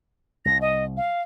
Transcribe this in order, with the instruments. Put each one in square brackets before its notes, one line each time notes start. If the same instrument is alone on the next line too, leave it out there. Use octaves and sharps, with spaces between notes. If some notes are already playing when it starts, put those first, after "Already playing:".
[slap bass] C2 [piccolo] A#6
[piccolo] D#5
F5